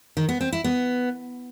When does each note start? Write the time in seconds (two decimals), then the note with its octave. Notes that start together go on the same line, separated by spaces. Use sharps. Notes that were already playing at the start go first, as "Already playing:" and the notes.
0.17 D#3
0.29 B3
0.41 C4
0.52 E4
0.64 B3